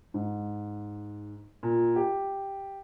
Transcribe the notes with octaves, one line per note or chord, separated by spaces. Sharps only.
G#2
A#2
G4